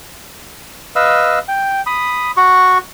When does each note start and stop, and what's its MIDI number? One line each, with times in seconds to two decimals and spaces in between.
0.96 1.39 71
0.96 1.39 75
0.96 1.39 77
0.96 1.39 88
1.48 1.81 79
1.86 2.31 83
1.86 2.31 87
2.37 2.78 66
2.37 2.78 85